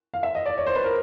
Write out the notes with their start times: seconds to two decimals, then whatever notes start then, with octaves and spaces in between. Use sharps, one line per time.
0.14 F5
0.23 E5
0.35 D#5
0.46 D5
0.58 C#5
0.67 C5
0.76 B4
0.84 A#4